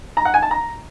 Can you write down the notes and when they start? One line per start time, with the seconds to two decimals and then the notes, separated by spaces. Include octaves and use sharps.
0.17 A#5
0.25 F#5
0.34 G#5
0.42 A5
0.51 A#5